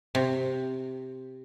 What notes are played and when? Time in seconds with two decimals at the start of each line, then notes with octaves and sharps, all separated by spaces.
0.15 C3